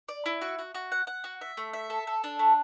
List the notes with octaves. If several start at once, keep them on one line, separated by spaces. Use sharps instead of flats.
D5
E4
F#4
F#4
F#4
F#5
F#5
F#4
E5
A3
E5
A4
A4
D4
A3